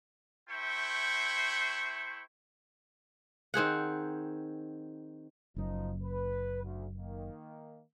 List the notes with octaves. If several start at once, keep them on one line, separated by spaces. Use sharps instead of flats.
A3 E4 C5 G5 C#6
D#3 C4 G#4 F#5
F#1 F#2 F3 D#4
B4
D2
D#3 A#3